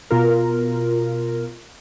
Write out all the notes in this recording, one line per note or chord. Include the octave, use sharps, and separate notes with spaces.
B2 F4 A#4